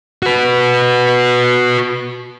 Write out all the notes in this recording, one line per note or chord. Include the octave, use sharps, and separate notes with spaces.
F#4 B4